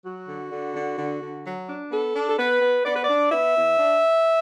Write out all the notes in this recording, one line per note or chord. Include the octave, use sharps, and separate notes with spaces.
F#3 F#4
D3
D3
D3
D3
D3
F#3
D4
B3 A4
D4
A4
B3 B4
B3
B3 D5
B4
D4 D5
B3 E5
E2
D4